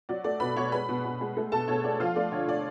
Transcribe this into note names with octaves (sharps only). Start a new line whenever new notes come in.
F#3 D5
A3 D5
B2 B4 B5
B2 C#5 C#6
G#3 B4 B5
B2
B2
G#3
A3
B2 A4 A5
B2 C#5
A3 D5
F3 F4 F5
A3 D5
D3 C#5
D3 D5